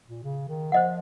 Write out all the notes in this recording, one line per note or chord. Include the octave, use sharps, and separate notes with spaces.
A#2
C#3
D#3
F3 C5 D#5 F#5